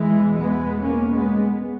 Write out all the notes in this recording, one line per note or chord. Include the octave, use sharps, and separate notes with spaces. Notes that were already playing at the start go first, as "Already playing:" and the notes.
Already playing: E2 B2 E3 G#3
G#3 B3
A#3 C#4
G#3 B3